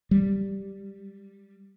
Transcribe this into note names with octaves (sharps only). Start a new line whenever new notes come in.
G3